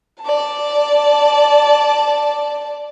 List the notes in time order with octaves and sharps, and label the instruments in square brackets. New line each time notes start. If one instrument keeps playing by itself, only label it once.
[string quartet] D5 A5